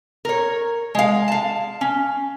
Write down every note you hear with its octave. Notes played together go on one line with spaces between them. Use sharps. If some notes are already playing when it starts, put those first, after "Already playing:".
A#4 C#5
G#3 F5
F5 A5
C#4